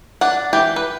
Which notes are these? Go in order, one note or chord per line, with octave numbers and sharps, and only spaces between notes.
D4 F#5
E3 G4
B4